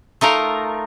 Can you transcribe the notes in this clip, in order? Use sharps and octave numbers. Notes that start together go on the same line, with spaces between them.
A3 D#4 F4 A#4